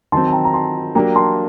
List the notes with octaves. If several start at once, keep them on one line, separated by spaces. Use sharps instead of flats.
D#3 F#3 C4 A5 C6
A5
G5 A#5
A#5
A5 C6
F#3 A#3 D4 G4 A#4 G5 A#5
A5 C6